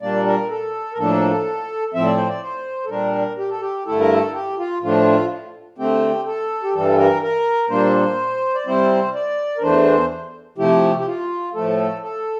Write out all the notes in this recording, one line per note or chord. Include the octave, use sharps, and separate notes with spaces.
A#2 G3 A#3 D4 D5
A#4
A4
A#4
A2 F3 A#3 D4 A4
A2 F3 C4 E5
D5
C5
D5
C5
A4
A#2 G3 D4 A#4
G4
A4
G4
G2 D3 A3 E4 A4
A#4
A4
G4
F4
A2 F3 A3 D4 F4
D3 A3 C4 G4
A4
G4
G2 E3 G3 A4
A#4
A#4
A#2 G3 A#3 D4 C5
D5
C3 G3 C4 E4 C5
D5
A#4
E2 E3 A3 D4 C5
C3 F3 A3 E4 G4
G4
F4
A2 F3 A3 A4
A4